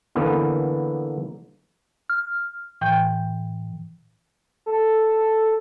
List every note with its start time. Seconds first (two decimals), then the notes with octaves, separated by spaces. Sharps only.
0.15 D3 E3 A#3 B3 E4
2.10 F6
2.81 A2 E3 G5 G6
4.66 A4